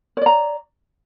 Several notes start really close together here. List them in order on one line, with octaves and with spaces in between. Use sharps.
C#5 D5 A#5